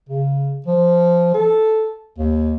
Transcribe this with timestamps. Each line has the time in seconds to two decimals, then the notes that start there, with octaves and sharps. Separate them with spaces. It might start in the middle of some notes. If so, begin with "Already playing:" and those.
0.09 C#3
0.66 F3
1.34 A4
2.18 D#2